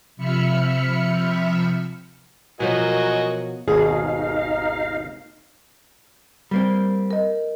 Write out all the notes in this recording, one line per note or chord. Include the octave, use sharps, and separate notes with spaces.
C3 F3 E5 B5 F6 C#7
B2 F3 F#3 B3 F#4 A#4 D#5 G#5
G#1 D#2 B2 D#4 G#4 F5
G3 A#3 C4
A#4 D#5